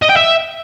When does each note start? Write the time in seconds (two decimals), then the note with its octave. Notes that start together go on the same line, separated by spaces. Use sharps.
0.02 D#5
0.09 G5
0.17 E5